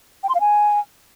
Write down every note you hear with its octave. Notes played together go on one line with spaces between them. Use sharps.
G5
C6
F5
G#5